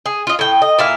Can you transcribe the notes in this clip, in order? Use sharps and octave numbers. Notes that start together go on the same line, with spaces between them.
G#4
F4 D#5
A2 G5
D#5
A#2 E4 F5